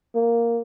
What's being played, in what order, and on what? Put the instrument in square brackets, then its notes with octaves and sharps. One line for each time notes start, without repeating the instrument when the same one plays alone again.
[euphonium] A#3